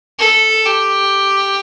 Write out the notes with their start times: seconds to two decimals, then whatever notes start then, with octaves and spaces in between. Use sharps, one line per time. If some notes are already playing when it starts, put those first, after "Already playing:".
0.19 A4
0.66 G4